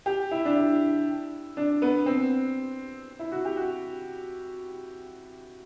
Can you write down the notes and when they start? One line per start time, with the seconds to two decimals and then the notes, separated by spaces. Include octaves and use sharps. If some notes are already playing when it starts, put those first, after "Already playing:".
0.06 G4
0.31 E4
0.45 D4
0.56 E4
1.57 D4
1.82 B3
2.06 C4
3.19 E4
3.32 F#4
3.45 G4
3.57 F#4